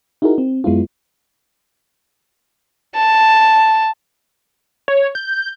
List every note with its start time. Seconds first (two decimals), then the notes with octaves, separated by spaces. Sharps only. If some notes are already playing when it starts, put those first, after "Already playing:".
0.22 D#4 E4 F#4 G#4 A#4
0.38 C4
0.64 F#2 G#3 B3 E4 F4
2.95 A5
4.88 C#5
5.15 G6